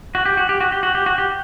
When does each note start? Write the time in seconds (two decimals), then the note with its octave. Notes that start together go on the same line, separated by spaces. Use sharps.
0.15 F#4
0.26 G4
0.37 F#4
0.49 G4
0.61 F#4
0.72 G4
0.83 F#4
0.95 G4
1.06 F#4
1.18 G4